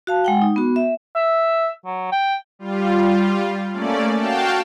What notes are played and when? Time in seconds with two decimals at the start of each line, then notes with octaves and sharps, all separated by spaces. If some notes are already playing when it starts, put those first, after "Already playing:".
0.07 F#4 F5 A5
0.24 G#3 F#5 G5
0.42 D#4
0.56 B3 F#4
0.76 E5
1.15 E5
1.85 F#3
2.12 G5
2.59 G3 F4
3.73 A3 A#3 C#4 D5
4.15 F#4 F5 G5 A5